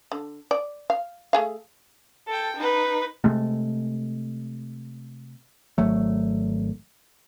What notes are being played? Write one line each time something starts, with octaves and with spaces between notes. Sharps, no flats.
D3
D5
F5
A3 G#4 F5
A4 G5
D#4 B4
C3 G#3 A3
G#1 F#3 A3